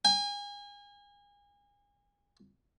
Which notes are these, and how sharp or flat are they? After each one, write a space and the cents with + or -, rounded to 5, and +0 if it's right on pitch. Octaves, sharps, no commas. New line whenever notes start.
G#5 -35